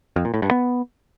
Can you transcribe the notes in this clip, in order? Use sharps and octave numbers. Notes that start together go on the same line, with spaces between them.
F2
A#2
A2
G2
B3